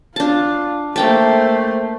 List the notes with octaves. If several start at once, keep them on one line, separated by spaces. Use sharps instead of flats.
D4 F4 A5
A3 A#3 C5 G5 A5